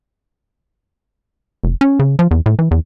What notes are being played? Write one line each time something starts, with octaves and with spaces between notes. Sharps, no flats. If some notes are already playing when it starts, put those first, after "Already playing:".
F1
C#4
C#3
F3
E2
A2
E3
E2